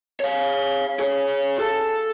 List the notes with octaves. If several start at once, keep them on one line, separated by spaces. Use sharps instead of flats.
C#5 F5
G#4 C#5
A4